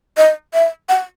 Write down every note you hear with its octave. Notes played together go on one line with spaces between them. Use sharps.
D#5
E5
F#5